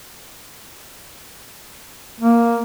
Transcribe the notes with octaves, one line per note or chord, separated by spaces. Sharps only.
A#3